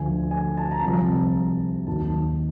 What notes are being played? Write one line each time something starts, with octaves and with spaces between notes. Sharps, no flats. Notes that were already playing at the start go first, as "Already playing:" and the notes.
Already playing: D2 D3 F3 G#5
G#5
A5
A#5
C2 C3 F3 A5
D#2 D#3 F#3 A5